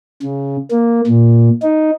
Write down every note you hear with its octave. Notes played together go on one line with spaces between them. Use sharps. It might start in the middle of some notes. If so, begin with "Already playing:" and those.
C#3
A#3
A#2
D#4